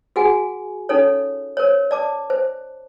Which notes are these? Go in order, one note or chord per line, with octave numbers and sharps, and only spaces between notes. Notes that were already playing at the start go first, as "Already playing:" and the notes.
F#4 G#4 F#5 G#5
C#4 D#4 A4 C#5
A#4 C5 C#5
D5 A5 D6
C5